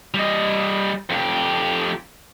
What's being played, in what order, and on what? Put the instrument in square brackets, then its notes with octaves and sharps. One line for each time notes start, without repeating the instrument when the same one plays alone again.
[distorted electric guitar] G3 D#5
F2 G4